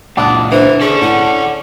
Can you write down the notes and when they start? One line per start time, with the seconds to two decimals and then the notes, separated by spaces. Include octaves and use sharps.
0.17 C#2 A#2 D4 F#5 A5 D#6
0.52 D3 E3 C5
0.81 C#4 G#4 A4 D5
1.02 A2 F#5